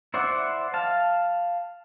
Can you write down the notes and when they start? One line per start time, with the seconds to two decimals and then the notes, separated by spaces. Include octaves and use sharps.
0.14 E4 C5 D5 E5 F#5
0.74 F5 A5